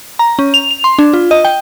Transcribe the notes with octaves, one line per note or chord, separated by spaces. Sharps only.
A#5
C#4
F7
F7
C6
D4
F4
D#5
G5